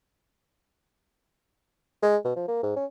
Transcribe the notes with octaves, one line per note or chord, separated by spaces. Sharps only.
G#3
B2
F3
A#3
G#2
C#4